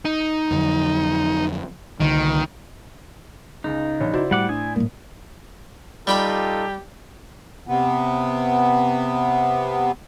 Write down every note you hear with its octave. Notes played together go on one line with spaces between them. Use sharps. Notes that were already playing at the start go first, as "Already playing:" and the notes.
D#4
F2 D3 F#3
C2 D3 D#3
C#2 G#3 D#4
A#1 C#5
C#3 E4 F#4 C5 D5
A2 G3 F#5 D6
D4 G#5 D#6
A2 G3 A#3
G3 D#4 F4 G4 A4 G5 B5
C3 B3